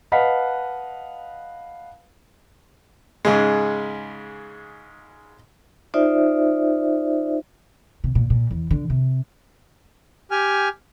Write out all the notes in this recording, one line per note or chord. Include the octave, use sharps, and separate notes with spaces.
B4 D#5 F5 F#5 A5 B6
G#2 C#3 G#3
D#4 F4 C5 D5 E5
C3
A#2
A#2
E2
D3
C3
G4 G5 G#5 F6